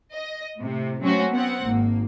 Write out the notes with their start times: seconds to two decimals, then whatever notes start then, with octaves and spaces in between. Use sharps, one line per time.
0.11 D#5
0.61 A2 C3
1.02 F#3 A3 C4 C#4 F#4
1.32 B3 C4 F#5
1.61 G#1 A#3